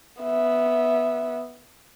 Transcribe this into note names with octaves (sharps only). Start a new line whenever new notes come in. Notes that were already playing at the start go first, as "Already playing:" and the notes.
B3 E5